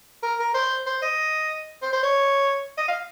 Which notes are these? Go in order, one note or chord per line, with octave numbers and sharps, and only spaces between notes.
A#4
A#4
C5
C5
D#5
C5
C5
C#5
D#5
F5